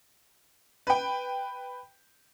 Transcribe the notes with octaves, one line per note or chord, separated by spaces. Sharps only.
B4 G5